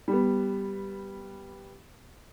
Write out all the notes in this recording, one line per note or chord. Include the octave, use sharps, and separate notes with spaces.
G3 B3